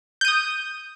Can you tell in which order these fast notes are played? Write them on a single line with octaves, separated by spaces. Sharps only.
G6 D#7 D#6